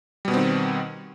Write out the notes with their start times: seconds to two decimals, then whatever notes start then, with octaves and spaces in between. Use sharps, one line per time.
0.25 G3
0.28 B2
0.31 B3
0.34 C4
0.37 D#3